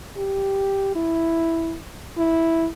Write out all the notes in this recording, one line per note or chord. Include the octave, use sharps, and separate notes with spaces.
G4
E4
E4